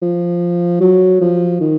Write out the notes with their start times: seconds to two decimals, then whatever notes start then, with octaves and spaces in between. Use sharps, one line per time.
0.02 F3
0.81 F#3
1.21 F3
1.60 D#3